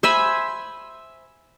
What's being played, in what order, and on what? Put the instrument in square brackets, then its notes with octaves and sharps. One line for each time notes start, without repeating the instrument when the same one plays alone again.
[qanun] C5 E5 G#5 B5